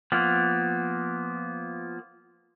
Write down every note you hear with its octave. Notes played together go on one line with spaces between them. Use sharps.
F3 A#3 B3